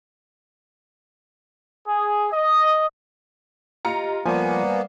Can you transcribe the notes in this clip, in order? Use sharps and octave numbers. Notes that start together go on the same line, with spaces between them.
G#4
D#5
F4 G4 D#5 A#5 C#7
F3 G3 A#3 B3 C5 D5 G#5